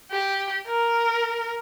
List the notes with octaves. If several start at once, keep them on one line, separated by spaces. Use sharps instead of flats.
G4
A#4